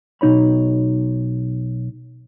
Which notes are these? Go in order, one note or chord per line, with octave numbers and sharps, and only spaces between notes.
B1 D#4 C#5 B5